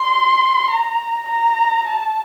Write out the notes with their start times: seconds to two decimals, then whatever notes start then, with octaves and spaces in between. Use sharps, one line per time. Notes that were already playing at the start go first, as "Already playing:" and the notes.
Already playing: C6
0.70 A#5
1.29 A#5
1.87 A5